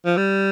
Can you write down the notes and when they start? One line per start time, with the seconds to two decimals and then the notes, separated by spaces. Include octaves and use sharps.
0.06 F3
0.17 G3